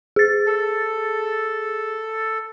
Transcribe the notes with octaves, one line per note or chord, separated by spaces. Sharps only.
G#4 A6
A4